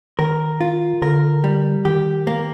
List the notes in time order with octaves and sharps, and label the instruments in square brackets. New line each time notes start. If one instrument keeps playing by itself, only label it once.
[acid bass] D#3 [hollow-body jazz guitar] A#4
[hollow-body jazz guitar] F4
[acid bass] D3 [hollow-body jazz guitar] A#4
[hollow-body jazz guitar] G3
[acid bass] D#3 [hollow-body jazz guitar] G4
[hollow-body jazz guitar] A#3